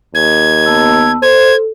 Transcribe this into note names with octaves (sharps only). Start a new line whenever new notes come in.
D#2 G#6
B3 A5 E6
A4 C5 G#6